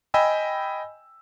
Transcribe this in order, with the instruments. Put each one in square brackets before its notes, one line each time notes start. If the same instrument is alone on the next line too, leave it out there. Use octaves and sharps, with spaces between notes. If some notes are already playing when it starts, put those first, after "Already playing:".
[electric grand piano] D#5 G5 G#5 B5 E6